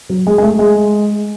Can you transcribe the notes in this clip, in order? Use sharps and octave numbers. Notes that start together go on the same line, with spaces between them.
F#3
G#3
G#3
A3
G#3